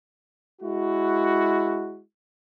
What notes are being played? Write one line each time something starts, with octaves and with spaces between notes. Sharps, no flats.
G#3 E4 F#4